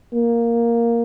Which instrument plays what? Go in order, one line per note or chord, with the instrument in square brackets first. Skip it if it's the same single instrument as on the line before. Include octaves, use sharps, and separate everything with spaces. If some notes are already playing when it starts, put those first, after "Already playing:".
[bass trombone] A#3